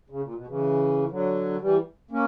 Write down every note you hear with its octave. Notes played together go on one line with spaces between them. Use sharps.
C#3
A#2
B2
C#3 E3
D3 F#3
E3 G3
A#3 C#4